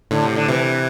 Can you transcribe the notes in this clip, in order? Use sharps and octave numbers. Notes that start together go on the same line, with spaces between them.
A2 D3
C3
D3
C3 E3